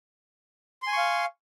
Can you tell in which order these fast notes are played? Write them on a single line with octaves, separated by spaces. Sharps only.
C6 G#5 C#6 F5